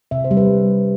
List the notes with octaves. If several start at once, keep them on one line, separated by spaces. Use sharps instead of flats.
C3 E5
C5
G3
B4